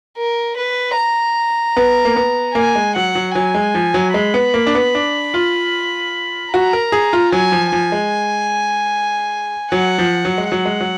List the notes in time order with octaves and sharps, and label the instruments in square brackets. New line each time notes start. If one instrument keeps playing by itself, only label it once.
[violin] A#4
B4
A#5
[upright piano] B3
A#3
B3
[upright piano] A#3 [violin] G#5
[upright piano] G#3
[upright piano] F#3 [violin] F#5
[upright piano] F#3
[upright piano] F#3 [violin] G#5
[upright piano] G#3
F3
F#3
[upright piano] G#3 [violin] B5
[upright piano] B3
A#3
D4
B3
D4
F4
[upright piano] F#4 [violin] A#5
[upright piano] A#4
G#4
F4
[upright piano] F#3 [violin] G#5
[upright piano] F3
[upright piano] F3 [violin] G#5
[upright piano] G#3
[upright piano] F#3 [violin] F#5
[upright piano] F3
F#3
G#3
[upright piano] F#3 [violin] F#5
[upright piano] G#3
F#3